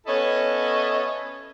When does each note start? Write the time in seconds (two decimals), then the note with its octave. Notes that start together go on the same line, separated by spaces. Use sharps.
0.07 B3 C#4 E4 A4 C#5 D#5